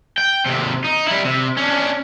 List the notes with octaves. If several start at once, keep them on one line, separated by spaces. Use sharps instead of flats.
G5
D#2 C3
D#4
G3 E4
C3
C#4 D4